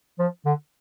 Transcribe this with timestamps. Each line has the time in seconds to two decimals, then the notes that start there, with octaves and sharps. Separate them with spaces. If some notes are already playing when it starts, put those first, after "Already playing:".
0.19 F3
0.45 D3